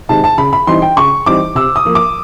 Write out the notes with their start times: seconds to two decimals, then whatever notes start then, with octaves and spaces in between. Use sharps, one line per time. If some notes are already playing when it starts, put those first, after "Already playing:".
0.09 C3 D#3 G#3 A5
0.24 A5
0.38 C#3 B5
0.53 B5
0.67 E3 G3 C4 D#4 C6
0.82 G5
0.97 C#3 C#6
1.26 E3 G3 C4 D#4 D6
1.55 C3 E6
1.76 D#6
1.85 F3 A#3
1.95 D6